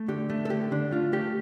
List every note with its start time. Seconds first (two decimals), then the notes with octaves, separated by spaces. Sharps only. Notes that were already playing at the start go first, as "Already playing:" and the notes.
Already playing: A3
0.08 D3 G4
0.30 A3
0.45 A4
0.50 D3 G4
0.71 D3 D4
0.91 A3 F4
1.13 A3 G4